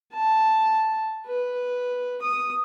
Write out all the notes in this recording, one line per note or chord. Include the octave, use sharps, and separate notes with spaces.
A5
B4
D#6